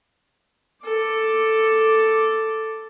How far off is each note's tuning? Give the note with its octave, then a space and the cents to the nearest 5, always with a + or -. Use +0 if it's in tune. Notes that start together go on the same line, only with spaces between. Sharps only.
A4 +5 D6 +0